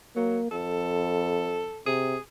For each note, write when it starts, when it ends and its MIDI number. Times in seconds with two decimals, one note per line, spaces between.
0.16 0.39 54
0.16 0.51 58
0.51 1.73 41
0.51 1.80 69
1.86 2.15 48
1.86 2.19 68